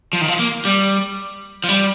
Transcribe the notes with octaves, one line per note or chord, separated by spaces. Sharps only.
F3
D#3
F3
A#3
G3
F3
G3